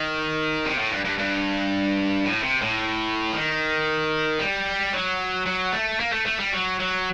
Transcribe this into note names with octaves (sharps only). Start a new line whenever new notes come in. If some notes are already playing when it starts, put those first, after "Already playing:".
Already playing: D#3
C3
A2
G2
G2
G2
A2
C3
A2
D#3
G3
F#3
F#3
A3
A#3
A3
A3
G3
F#3
F#3